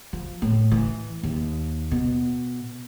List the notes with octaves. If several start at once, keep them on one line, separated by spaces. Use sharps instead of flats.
F3
A2
E3
D#2
B2